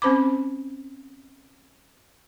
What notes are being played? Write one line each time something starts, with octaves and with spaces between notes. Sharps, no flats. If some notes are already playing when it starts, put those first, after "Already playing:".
C4 C#4 C5 B5 D6